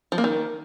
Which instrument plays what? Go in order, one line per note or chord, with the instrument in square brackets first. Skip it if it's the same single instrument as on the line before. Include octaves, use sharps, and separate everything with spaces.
[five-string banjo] F3
A#3
D#3